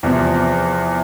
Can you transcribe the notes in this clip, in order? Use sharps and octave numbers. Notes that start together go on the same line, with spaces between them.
E2 C3 F3